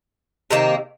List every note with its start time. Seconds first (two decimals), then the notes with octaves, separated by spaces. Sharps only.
0.51 C3 D#3 A#3